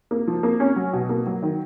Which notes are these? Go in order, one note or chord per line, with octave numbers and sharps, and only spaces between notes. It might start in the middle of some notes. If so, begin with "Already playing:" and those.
A#3
F3
A#3
C#4
F#3
B2
A#3
F#3
D#3